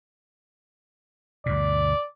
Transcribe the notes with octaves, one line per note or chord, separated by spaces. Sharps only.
D2 G2 B2 D5